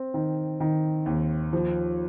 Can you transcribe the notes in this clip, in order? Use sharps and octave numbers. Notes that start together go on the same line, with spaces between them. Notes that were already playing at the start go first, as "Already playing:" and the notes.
Already playing: C4
D#3
D#3
D#2
F3